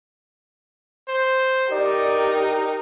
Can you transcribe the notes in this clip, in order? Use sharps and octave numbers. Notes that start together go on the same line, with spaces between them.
C5
D#4 G4 A#4 D5